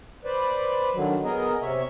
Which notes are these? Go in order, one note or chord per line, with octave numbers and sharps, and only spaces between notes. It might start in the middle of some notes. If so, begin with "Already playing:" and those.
B4 C5 D5
D3 D#3 F#3
B3 G#4 A#4 D#5
C3 C#5 E5